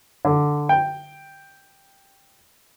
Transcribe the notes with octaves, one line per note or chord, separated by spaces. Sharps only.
D3
G5